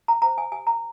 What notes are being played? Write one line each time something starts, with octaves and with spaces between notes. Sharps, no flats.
A#5
C5 A#5
G#5
G4 G#5
A#5